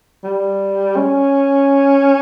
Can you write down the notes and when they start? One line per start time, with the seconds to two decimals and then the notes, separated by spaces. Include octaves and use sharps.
0.24 G3
0.96 C#4